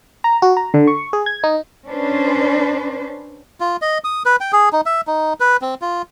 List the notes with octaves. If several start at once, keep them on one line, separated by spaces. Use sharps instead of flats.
A#5
F#4
A#5
D3
C#6
G#4
G#6
D#4
C#4 D4 B4 C5
F4
D#5
D#6
B4
G5
G#4
D#4
E5
D#4
B4
C4
F4